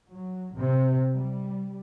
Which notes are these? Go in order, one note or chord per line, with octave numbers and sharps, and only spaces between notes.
F#3
C3
G3